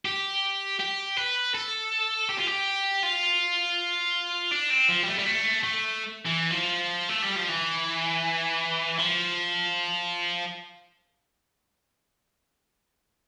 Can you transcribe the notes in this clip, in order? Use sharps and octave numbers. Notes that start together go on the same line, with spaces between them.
G4
G4
B4
A4
G4
F4
G4
F4
D4
C4
F3
G3
A3
G3
A3
A3
E3
F3
A3
G3
F3
E3
F3